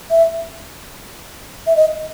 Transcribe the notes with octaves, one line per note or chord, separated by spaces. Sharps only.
E5
E5
D#5